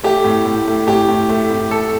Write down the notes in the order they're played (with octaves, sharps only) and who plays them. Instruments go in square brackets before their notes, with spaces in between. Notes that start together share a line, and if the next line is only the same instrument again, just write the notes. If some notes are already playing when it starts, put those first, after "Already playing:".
[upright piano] A3 [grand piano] G4
[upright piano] A2
A2
A3
[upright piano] A2 [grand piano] G4
[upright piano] A2
A3
A2
[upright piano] A3 [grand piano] A4